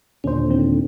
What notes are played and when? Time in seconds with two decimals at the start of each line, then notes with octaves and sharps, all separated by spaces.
0.24 D#2 A#2 D3 C#4 C5
0.50 D#3 C4